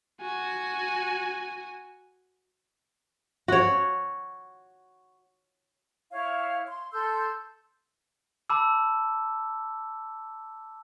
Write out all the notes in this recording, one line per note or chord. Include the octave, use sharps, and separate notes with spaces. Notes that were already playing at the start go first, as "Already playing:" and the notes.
F#4 G#5
F#4 C#5
E4 C#5 F5
C6
A4 C6 E6 G6
A5 B5 D6 E6